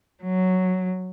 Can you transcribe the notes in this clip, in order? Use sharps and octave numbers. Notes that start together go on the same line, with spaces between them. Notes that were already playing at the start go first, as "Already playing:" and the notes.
F#3